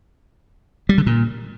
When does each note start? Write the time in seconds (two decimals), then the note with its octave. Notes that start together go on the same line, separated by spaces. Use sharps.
0.89 G3
0.98 D3
1.06 A#2